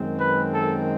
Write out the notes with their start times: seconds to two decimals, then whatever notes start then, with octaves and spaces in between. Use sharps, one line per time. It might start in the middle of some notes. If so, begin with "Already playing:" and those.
Already playing: F#2 D#3 G#3 C4
0.20 B4
0.52 A4